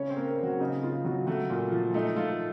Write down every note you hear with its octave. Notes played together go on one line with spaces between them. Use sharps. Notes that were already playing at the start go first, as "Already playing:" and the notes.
Already playing: C#3 C#4 C#5
C4 C5
A#3
A#3 A#4
F#3 A#3 F#4
C#3 D#4
C#3 F4
C#3 F#3 F#4
F#3 A3 F#4
A#2
F3
A3 D#4
A3 F4